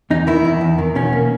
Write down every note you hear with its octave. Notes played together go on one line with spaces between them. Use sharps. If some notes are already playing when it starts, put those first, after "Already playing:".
E2 D#4
D#3 E4
E2
E2
D#3
B2 C#4
A#3